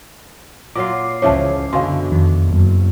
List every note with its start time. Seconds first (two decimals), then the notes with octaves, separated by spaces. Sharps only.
0.75 A#2 F#3 F4 D6 C7
1.22 C#2 C#3 E3 F3 C#5 E5 A5
1.73 F#2 B2 D3 F5 G#5 C6
2.12 F2 D#3
2.47 F#1